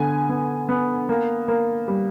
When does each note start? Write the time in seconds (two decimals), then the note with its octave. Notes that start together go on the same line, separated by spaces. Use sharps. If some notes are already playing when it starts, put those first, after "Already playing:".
Already playing: D3 B3 G#5
0.29 B3
0.69 B3
1.09 A#3
1.48 A#3
1.88 G3